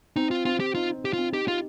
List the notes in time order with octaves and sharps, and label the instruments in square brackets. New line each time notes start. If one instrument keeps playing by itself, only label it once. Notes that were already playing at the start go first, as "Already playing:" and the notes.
[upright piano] C4 [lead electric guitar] D#4
[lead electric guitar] F4
[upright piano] C4 [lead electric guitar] F4
[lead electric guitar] G4
[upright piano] D#4 [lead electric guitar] F4
[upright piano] D#4
[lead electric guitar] G4
[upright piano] C4 [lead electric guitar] F4
[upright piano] D#4 [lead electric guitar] G4
[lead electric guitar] F4 [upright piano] G4